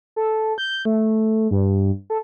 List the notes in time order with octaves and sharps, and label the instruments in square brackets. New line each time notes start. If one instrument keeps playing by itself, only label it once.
[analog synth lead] A4
G6
A3
G2
A4